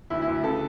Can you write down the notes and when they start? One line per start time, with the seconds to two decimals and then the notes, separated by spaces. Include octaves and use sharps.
0.10 D2 E4
0.22 E4
0.28 D2
0.43 C#3 A4